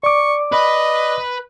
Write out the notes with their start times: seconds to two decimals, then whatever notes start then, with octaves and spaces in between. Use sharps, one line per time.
0.03 D5 C#6 D6
0.52 B4 D#5